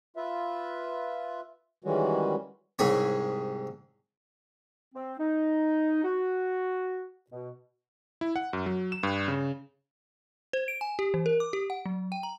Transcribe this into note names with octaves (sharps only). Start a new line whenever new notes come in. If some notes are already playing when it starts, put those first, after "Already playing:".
F4 B4 E5
D#3 E3 G3 G#3 C#4 F#4
C2 G#2 C#5
C4
D#4
F#4
B2
E4
F#5
F#2
F#3
E7
G2
C#3
C5
D7
G#5
G4
E3
A#4
D6
G4
F#5
F#3
G5
A#5